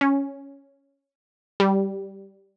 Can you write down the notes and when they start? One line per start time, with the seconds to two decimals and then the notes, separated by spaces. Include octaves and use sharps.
0.01 C#4
1.60 G3